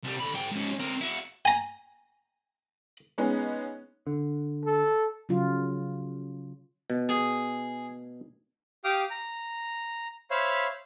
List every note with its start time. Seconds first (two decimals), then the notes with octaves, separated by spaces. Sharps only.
0.03 C2 G3
0.20 D3 B5
0.35 G#2 G5
0.52 G#2 C#4
0.79 C4 A#4
1.01 E4 F#4
1.45 G#5 A#5
3.18 G#3 B3 C#4 D#4
4.07 D3
4.64 A4
5.29 C#3 F#3 F4
6.90 B2
7.09 G#4
8.84 G4 F5 G5 D6 D#6 F6
9.11 A#5
10.31 C5 C#5 E5 F5 B5